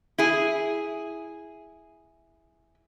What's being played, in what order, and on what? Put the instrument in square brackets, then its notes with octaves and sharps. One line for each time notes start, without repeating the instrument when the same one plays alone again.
[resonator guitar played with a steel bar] E4 G#4